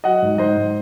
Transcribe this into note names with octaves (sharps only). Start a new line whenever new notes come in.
F#3 D#5 F#5
G#2
G#2 C5 D#5
G#2